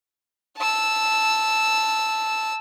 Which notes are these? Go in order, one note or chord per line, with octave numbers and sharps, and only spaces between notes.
A5 E6